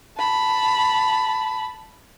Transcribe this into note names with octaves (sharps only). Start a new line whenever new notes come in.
A5 B5